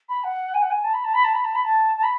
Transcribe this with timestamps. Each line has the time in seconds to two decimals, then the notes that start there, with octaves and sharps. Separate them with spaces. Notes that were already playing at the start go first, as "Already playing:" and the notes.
0.08 B5
0.23 F#5
0.53 G#5
0.61 F#5
0.70 G#5
0.83 A5
0.93 B5
1.04 A5
1.13 B5
1.23 A5
1.34 B5
1.44 A5
1.54 B5
1.64 A5
1.96 A5
2.03 B5